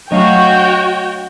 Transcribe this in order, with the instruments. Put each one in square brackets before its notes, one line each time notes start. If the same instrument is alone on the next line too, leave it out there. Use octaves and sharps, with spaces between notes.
[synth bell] F#3 A3 D4 [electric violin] F#4 C#5 [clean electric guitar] D#5 F5 [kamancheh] G5